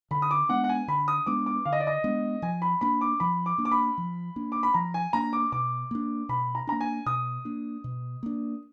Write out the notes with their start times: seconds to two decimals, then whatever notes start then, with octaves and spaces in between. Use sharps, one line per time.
0.11 D3 B5
0.22 D#6
0.31 D6
0.49 G#3 B3 D4 F#5
0.64 F#5
0.69 G#5
0.88 D3 B5
1.08 D#6
1.26 G#3 B3 D4 D6
1.46 D6
1.65 D3 F5
1.73 D#5
1.80 D5
1.87 D#5
2.04 G#3 B3 D4
2.42 F3 G#5
2.62 B5
2.81 A#3 D4 B5
3.01 D6
3.20 F3 B5
3.46 D6
3.58 A#3 D4
3.65 D6
3.72 B5
3.98 F3
4.36 A#3 D4
4.52 D6
4.63 B5
4.74 F3 A#5
4.94 G#5
5.13 A#3 D4 A#5
5.33 D6
5.52 B2 D6
5.91 A#3 D4
6.29 B2 B5
6.55 A#5
6.67 A#3 D4 A#5
6.81 G#5
7.06 B2 D#6
7.45 A#3 D4
7.84 B2
8.23 A#3 D4